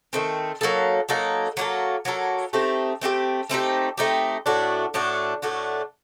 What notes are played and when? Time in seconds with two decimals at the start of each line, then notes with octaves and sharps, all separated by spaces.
0.13 D#3 A3 C4
0.61 F#3 A#3 D#4 A4
1.09 F#3 A#3 D#4 A4
1.57 F#3 A#3 D#4 A4
2.05 F#3 A#3 D#4 A4
2.53 A3 C4 D#4 G4
3.02 A3 C4 D#4 G4
3.49 A3 C4 D#4 G4
3.98 A3 C4 D#4 G4
4.46 A2 A3 D4 F#4
4.94 A2 A3 D4 F#4
5.42 A2 A3 D4 F#4